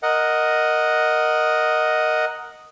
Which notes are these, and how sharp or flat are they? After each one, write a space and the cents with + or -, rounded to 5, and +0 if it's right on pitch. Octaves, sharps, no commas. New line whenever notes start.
A#4 +0 D#5 +0 F#5 +0